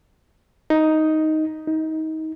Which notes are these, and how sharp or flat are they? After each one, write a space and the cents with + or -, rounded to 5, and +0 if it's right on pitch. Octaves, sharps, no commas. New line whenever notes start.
D#4 +5
D#4 +25